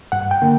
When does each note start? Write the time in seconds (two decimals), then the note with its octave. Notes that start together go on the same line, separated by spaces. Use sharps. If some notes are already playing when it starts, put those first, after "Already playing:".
0.12 G2 F#5
0.31 G5
0.42 D3 A#3